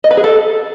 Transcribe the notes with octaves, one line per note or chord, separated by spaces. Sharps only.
D#5
B4
G#4
A4